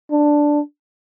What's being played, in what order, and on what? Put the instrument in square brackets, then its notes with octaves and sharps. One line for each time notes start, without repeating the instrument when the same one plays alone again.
[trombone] D4